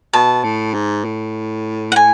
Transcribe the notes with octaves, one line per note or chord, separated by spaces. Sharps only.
B2 A5
A2
G#2
A2
F#5
G#5